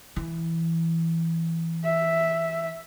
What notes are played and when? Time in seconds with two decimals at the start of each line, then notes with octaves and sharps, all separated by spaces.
0.16 E3
1.85 E5